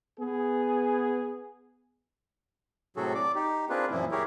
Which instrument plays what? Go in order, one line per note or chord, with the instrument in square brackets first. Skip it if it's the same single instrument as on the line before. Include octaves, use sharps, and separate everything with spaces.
[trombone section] B3 G#4
[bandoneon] A2 C3 F#3 F#4 G#4 A4
D5 D6
D#4 G4
A#3 C4 D4 F4 G#4 B4
F#2 A#2 E3 F3 A#3 E4
E4 G4 G#4 A#4 C#5